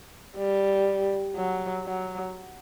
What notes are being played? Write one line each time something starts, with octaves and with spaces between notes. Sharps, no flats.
G3
F#3
F#3